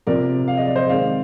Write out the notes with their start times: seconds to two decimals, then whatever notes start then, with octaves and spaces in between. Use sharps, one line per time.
0.07 C3 F3 C4 A#4 D5
0.48 F5
0.57 D#5
0.66 D5
0.76 C5 D#5
0.89 D#3 G#3 C4 D5 F5